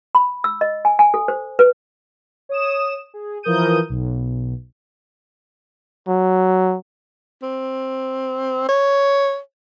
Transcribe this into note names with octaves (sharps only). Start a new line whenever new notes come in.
B5
E6
D#5
G#5
G#5
A4
C5
B4
C#5 D#6 E7
G#4
E3 F3 A#4 D#6 G6 D#7
B1
F#3
C4
C#5